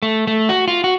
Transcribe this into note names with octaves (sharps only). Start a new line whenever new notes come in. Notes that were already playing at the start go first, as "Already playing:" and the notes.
A3
A3
F#4
F4
F#4